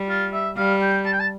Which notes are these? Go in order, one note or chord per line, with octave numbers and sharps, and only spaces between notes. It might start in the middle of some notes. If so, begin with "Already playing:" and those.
Already playing: G3
F4
E5
G3 F5
G5
A5
G5
A5